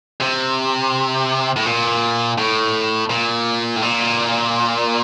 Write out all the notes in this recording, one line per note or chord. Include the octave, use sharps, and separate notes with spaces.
C3
A2
A#2
A2
A#2
A2
A#2